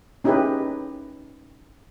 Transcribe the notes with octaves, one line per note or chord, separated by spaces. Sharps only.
C#4 D#4 E4 G4 G#4 B4